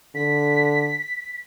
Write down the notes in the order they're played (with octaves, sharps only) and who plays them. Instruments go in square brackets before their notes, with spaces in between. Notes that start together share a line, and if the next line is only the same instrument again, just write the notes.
[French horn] D3 [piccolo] B6